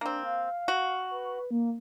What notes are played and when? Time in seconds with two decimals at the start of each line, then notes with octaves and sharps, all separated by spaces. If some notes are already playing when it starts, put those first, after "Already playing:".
0.01 A#3 C4 D4
0.23 F5
0.68 F#4
1.11 B4
1.51 A#3